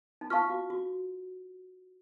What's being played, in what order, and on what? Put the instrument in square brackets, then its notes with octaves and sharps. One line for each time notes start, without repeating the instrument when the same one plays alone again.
[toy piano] D#4
[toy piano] F4 [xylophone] F5 A5 C#6 F6
[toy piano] F#4
F#4